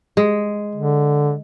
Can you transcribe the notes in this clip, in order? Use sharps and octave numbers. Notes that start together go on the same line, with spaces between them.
G#3
D3